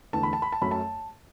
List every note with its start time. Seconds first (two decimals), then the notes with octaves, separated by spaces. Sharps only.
0.13 E2 D3 A3 A5
0.23 B5
0.33 A5
0.42 B5
0.52 A5
0.62 F#2 F#3 A3 B5
0.71 A5